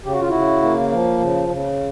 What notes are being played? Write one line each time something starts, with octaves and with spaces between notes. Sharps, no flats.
C#3 G4
F#4
F4
C#3 E4 F#4
A#3
F3
C#3
C#3